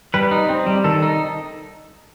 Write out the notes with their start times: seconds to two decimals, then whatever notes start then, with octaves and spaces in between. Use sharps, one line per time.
0.14 G3 B4
0.31 D#4
0.49 C4
0.67 G3
0.84 D#3 A4
1.02 D#4